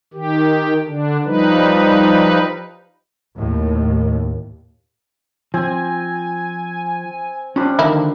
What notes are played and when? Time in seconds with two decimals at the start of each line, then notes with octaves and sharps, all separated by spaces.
0.14 D#3 G4
0.87 D3 D4
1.25 F3 G3 D#4 B4
3.37 D#2 A2
5.54 F3 C4 G#5
7.56 F3 G3 C#4 D4 B5
7.79 D3 D#3 A#3 E4